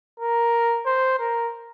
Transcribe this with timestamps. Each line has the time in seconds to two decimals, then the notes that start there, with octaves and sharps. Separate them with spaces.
0.20 A#4
0.86 C5
1.19 A#4